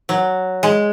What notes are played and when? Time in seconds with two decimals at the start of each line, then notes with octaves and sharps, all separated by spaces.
0.09 F#3
0.63 G#3